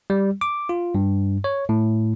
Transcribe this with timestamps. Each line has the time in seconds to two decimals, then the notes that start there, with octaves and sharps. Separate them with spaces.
0.10 G3
0.41 D6
0.69 F4
0.95 G2
1.44 C#5
1.69 A2